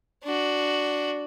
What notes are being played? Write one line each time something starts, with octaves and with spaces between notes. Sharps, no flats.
D4 F#4